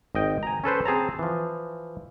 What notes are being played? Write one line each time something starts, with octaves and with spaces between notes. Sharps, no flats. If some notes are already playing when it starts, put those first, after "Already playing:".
G#1 D#5 G5
G#5 A#5
C#4 A4 B4 C5
C4 G#4 A5 A#5
E3 F3